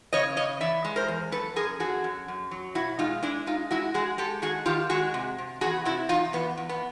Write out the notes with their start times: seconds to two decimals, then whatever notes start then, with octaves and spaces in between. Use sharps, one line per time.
0.13 C#3 C#5 D#5
0.37 C#3 C#5 D#5
0.61 E3 D5 E5
0.85 G#3
0.96 A#4 C5
1.08 E2
1.32 F#3 A4 B4
1.56 F#2 G#4 A#4
1.80 F#2 F#4 G#4
2.04 F#2
2.28 F#2
2.51 F#3
2.75 B2 E4 F#4
2.99 G#3 D#4 F4
3.23 G#3 D4 E4
3.46 G#3 D#4 F4
3.71 G#3 E4 F#4
3.94 G#3 F#4 G#4
4.18 G#3 G4 A4
4.42 D#3 F#4 G#4
4.66 D#3 F4 G4
4.90 G#3 F#4 G#4
5.14 C3
5.38 C3
5.61 E2 F#4 G#4
5.85 C3 E4 F#4
6.09 E2 D#4 F4
6.33 E2 B3
6.57 E2
6.69 B3